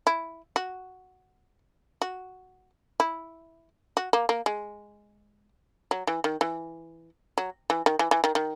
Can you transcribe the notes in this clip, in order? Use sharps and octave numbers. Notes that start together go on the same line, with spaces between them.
E4
F#4
F#4
E4
F#4
A#3
A#3
G#3
F#3
E3
D#3
E3
F#3
E3
D#3
E3
E3
D#3
D#3